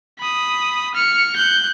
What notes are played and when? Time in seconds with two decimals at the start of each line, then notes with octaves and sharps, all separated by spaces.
0.19 B5 D#6
0.94 F6 C#7
1.36 F#6 G6